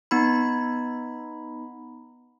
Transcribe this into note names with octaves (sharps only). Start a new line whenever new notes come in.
B3 D#4 B5